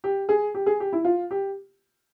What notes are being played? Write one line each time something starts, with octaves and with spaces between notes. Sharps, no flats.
G4
G#4
G4
G#4
G4
E4
F4
G4